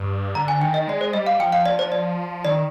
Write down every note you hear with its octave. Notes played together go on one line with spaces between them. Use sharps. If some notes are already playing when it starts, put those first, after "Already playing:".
Already playing: G2
D3 A#5
G#5
D#3 G5
D#5
G#3 D5
C5
G3 D#5
F5
F3 G5
F5
D5
C5
D5
D#3 D5